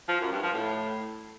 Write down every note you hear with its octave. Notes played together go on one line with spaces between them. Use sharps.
F3
F#2
G2
F3
A2